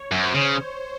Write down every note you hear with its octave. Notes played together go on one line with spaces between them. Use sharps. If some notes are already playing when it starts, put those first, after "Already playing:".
Already playing: C#5
F#2
C5
C#3